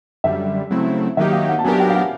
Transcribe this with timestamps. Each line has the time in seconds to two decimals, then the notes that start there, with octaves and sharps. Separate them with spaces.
0.24 F#2 D3 G3 E5
0.70 C#3 F#3 A3 C4 E4
1.17 D#3 F#3 A#3 D#4 G4 E5
1.33 F5
1.49 F#5
1.59 A5
1.64 F#3 B3 D4 G4 A#4 G#5
1.80 G5
1.90 F5
1.95 F#5